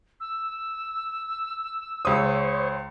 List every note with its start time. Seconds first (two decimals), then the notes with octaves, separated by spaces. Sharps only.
0.20 E6
2.05 C#2 C5 C#5 D#6